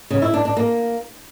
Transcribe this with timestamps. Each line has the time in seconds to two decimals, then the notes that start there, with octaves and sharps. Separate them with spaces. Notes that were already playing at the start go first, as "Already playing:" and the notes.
0.10 C#3
0.22 E4
0.34 D4
0.45 D4
0.57 A#3